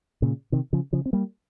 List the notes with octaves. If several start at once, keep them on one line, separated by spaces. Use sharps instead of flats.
A#2 C#3
C3 D#3
C#3 F3
C#3 F3
C4
G3 A#3